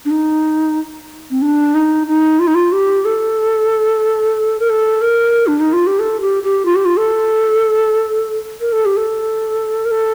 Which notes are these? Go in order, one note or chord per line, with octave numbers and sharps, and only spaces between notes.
D4
D#4
C4
D4
D#4
D#4
F4
D#4
F4
G4
A4
A#4
A4
A#4
D4
D#4
F4
G4
A4
G4
G4
F4
G4
F4
A4
A#4
A4
G4
A4
A#4
A4